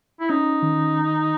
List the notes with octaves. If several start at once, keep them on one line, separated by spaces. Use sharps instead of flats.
E4
C#4 D#4
D#3